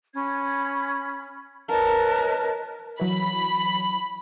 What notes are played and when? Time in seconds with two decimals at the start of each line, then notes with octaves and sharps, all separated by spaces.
0.13 C#4 B5 G#6
1.69 A#4 B4 C#5 D#5 A5
3.00 E3 F#3 B5